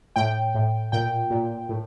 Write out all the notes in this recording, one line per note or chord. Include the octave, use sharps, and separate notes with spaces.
A2 G5
A2
A#2 G5
A#2
A2